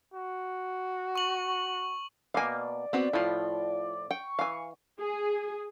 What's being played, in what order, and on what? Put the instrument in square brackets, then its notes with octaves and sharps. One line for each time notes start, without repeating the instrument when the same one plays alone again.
[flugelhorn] F#4
[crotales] C#6 F#7
[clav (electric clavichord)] B2 A#3 [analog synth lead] D5 [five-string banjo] F5 G#5
[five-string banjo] B3 C4 F#4
[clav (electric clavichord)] A2 F3 [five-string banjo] E4 F4
[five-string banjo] G5 [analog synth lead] C#6
[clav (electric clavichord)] E3 [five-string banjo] F5 G#5
[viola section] G#4